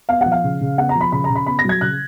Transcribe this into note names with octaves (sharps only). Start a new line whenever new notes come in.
B3 F5
F3 F#5
F5
C#3
C#3
B3 F#5
A#5
F3
B5
C#3 B5
A#5
C#3
B5
B3 B5
A#6
F#3 G#6
C#3 F#6